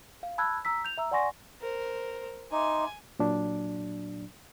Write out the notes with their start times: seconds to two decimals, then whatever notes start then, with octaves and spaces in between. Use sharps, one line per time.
0.23 F5
0.38 A5 B5 E6 F#6 G#6
0.65 A#5 E6 B6
0.85 G6 F7
0.98 E5 A#5 E6
1.11 D5 F#5 G#5 C6 C#6 A#6
1.61 A#4 C5
2.52 D#4 E5 G#5 C6 D6
3.19 A#2 F#3 D4